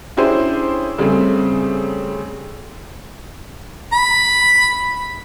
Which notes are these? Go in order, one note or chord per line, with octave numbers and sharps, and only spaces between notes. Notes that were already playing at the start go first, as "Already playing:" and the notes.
C#4 D4 E4 G4 G#4 C5
C#3 G3 A3 C4 G#4
B5